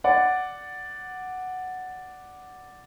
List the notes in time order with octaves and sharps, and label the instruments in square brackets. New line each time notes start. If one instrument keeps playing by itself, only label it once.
[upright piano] D5 F#5